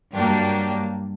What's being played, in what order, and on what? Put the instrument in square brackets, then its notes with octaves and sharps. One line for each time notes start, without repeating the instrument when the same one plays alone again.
[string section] G2 F#3 A#3 D4 G4